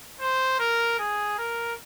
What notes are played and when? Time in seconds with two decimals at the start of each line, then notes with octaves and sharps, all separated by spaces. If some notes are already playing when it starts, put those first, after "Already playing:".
0.20 C5
0.59 A#4
0.99 G#4
1.38 A#4